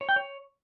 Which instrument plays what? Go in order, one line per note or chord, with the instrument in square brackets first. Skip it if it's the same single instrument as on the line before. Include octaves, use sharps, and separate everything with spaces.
[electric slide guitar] C#5
G5
C#5